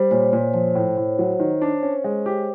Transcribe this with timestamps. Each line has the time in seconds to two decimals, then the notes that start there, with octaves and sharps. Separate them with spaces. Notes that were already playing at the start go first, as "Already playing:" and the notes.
Already playing: G3 C5
0.11 A#2 C#5
0.33 A#2 C5
0.54 F3 C5
0.75 A2
0.97 A2
1.19 F#3
1.40 D#3
1.62 D4
1.83 C#4
2.04 G#3
2.26 G4